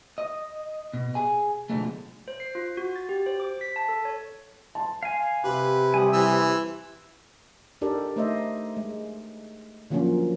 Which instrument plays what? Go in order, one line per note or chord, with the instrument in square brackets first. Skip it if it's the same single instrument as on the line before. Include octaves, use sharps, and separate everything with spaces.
[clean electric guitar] D#5
B2
G#4 G#5
B2 D3 F3 G#3 A3
[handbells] C5
C7
F4
F#4
A6
G4
C5
D6
B6
A5
A4
C#5
[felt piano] A5 C6
[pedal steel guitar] F5 G#5
[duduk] C3 [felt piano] G4 [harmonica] B4
[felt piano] G3 [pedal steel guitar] G#5 D#6
[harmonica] E3 E6
[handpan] D4 D#4 G4 A4 A#4 D5
A3 D#4 C5 D#5 E5
G#3
D3 F3 F#3 A#3 C#4 F4